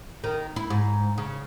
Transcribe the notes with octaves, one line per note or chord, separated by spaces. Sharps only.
D#3
E4
G#2
C#3